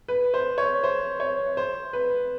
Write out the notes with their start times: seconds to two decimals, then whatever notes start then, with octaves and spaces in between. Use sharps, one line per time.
0.08 B4
0.34 C5
0.58 C#5
0.84 C5
1.20 C#5
1.57 C5
1.93 B4